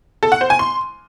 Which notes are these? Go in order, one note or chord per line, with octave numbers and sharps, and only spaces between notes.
A4
F#5
C5
G#5
C6